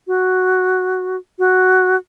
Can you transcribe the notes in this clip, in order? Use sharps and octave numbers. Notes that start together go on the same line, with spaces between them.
F#4
F#4